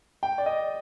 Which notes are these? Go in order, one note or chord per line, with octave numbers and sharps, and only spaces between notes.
G5
D5
D#5